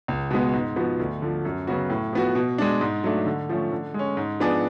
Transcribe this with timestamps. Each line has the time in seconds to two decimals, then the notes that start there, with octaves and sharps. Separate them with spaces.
0.08 C#2
0.31 B2 G#3 B3
0.53 G#2
0.76 F3 B3 F#4
1.00 D2
1.22 D3 F3
1.45 F#2
1.67 C#3 F#3 B3 F#4
1.90 A2
2.13 F3 B3 F#4
2.35 B2
2.58 G#3 D4
2.81 G#2
3.04 F#3 A3 D4
3.26 D3
3.49 F3 A3 C#4
3.72 D3
3.94 G#3 C#4
4.17 G#2
4.40 F3 B3 D4 G#4